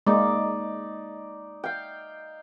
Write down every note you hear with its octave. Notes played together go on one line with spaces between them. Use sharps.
G#3 A#3 D#4 D5
F5 G5